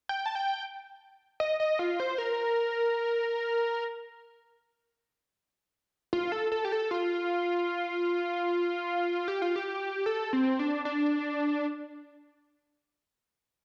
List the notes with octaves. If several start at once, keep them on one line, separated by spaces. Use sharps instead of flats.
G5
A5
G5
D#5
D#5
F4
C5
A#4
F4
A4
A4
G4
A4
F4
G4
F4
G4
A4
C4
D4
D4